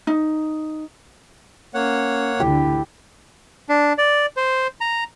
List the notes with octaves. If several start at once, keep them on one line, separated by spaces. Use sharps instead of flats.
D#4
A#3 C#4 C#5 F#5
D2 D3 E4 G4
D4
D5
C5
A#5